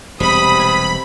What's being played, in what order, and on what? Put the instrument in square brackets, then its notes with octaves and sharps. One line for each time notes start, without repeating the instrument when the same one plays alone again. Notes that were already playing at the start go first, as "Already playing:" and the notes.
[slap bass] E1 G3 [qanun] C3 [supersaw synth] B5 [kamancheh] D#6
[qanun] G#5